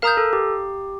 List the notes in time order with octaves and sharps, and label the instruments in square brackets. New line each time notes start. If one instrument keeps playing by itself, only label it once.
[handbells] A#4 [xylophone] F5 A#5 D#6 G6
[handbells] A4
G4